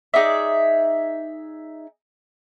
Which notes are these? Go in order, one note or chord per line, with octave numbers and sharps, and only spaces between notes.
D#4 G#4 D5 E5